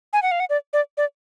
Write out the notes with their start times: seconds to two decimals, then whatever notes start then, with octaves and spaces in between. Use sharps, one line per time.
0.13 G#5
0.23 F#5
0.31 F5
0.40 F#5
0.50 D5
0.73 D5
0.97 D5